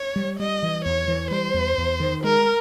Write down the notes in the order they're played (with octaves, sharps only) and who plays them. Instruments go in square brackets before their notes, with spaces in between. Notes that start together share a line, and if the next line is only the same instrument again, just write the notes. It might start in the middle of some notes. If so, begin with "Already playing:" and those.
Already playing: [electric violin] C#5
[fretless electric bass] G3
[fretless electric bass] G3 [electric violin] D#5
[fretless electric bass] E3
[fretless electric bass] E2 [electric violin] C#5
[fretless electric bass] E3
[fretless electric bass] G3 [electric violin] C5
[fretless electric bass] E2
E2
D#3
[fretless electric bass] G#3 [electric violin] A#4